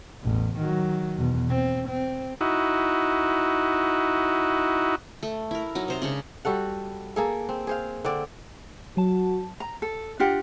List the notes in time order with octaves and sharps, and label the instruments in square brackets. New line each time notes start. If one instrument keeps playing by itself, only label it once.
[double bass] A1 E2
D#3 F#3
E2 B2
C4
C4
[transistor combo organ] D#4 E4 F#4
[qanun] A3
E4 A#4
F#3 D#4
C3 C5 A#5
C#3 G#3 D4 C#6
[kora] G3 F#4 A4 F#5
A#3 G#4 A4
C4
G#4 C5 F5
D3 C4 D5
[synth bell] F#3 A5 [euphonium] F#4
[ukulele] A#5
A4
D4 F4 G4 F#5